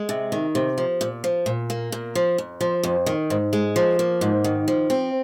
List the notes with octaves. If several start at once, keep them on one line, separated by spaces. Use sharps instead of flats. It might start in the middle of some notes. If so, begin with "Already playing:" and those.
Already playing: G#3
C3
D#3
C3
F3
A#2
F3
A#2
A#3
A#2
F3
F2
F3
F2
D#3
G#2
G#3
F3
A#3
G#2
D#3
F3
C4